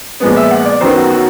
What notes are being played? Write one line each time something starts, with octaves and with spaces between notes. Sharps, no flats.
A#2 F3 G#3 B3
E5
F#5
D5
F#2 D#3 F#3 B3 C5
F#4
F#4